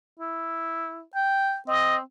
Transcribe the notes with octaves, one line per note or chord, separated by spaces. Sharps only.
E4
G5
C4 D#5